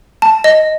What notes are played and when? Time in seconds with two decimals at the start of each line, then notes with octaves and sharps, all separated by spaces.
0.22 A5
0.44 D#5